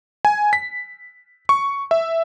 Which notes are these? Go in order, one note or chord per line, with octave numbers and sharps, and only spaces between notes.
G#5
B6
C#6
E5